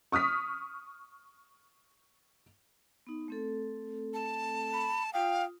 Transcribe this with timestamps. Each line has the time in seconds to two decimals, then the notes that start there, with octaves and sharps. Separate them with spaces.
0.12 C#6 D#6 F6 B6
3.07 B3 D#4
3.28 A3 C4 A4
4.14 A5
4.73 B5
5.13 F4 F5 G5 D#6